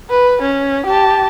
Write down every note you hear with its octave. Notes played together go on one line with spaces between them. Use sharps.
B4
C#4
G4 A5